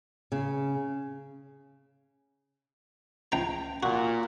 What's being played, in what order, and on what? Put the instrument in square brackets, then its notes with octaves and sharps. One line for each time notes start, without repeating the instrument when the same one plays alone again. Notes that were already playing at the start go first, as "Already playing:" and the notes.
[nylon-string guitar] C#3
[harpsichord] C#2 G5 A#5
[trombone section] A#2 [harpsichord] F#4